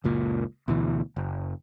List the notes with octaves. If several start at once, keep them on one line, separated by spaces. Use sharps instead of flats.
F#1 C#2 A#2
D2 B2 E3
F#1